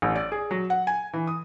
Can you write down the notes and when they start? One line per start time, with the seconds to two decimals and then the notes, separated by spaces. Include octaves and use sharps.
0.02 A1
0.16 D5
0.32 G#4
0.51 F#3
0.70 F#5
0.87 G#5
1.13 E3
1.27 D#6